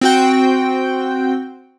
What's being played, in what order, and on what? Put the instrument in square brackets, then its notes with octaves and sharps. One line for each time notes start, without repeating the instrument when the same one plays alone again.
[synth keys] C4 F#4 G5